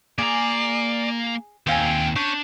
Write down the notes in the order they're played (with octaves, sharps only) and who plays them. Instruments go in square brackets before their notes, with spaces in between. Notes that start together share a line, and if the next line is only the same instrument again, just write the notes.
[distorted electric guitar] A#3 A#5 [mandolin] G#4 [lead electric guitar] D5
[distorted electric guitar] D#2 [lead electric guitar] A#2 G5 [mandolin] C4 F5 G#5
[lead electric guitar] C#4 [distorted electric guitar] D4 [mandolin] G6